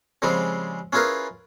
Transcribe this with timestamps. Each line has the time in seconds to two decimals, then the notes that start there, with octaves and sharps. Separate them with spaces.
0.22 C#3 F3 G3 G#3 C4
0.93 C#4 E4 F4 G#4 A#4 B4